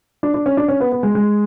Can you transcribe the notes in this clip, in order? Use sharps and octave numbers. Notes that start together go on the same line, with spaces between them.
D4
D4
C#4
D4
C#4
B3
B3
G#3
G#3